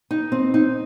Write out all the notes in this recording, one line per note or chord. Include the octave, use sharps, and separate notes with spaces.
D#4
C4
D#4